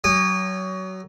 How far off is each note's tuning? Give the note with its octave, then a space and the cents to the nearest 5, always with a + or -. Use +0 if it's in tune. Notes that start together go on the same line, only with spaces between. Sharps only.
F#3 +25 G#5 -30 D#6 -25